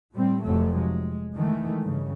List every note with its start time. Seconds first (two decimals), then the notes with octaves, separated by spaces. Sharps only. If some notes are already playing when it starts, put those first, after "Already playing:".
0.13 A2 G3 C4
0.43 F1 C3 F3 F#3 A3
0.77 G#3
1.34 D#3 E3 G#3 A3
1.81 G2 C#3